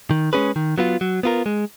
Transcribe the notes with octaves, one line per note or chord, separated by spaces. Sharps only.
D#3
G#3 C#4 G#4 B4
D#3
F#3 B3 F4
F#3
B3 F4 A#4
G#3